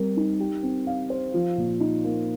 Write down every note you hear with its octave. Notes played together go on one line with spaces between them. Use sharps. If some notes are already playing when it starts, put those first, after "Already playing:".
Already playing: G3 C4 A#4
D#4
G4
C4
F5
C5
F3
A#2
D#4
A#3